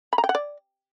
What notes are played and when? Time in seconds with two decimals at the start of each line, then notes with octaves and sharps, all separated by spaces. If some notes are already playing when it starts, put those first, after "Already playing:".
0.13 B5
0.18 A#5
0.24 G5
0.29 F#5
0.35 D5